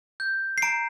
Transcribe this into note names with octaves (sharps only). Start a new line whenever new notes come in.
G6
C7
A#5 D7